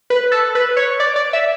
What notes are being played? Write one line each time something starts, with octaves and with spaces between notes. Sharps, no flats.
B4
A4
B4
C#5
D5
D5
E5